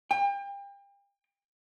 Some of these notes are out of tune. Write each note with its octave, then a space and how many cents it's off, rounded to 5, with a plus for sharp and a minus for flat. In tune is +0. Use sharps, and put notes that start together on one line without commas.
G5 +35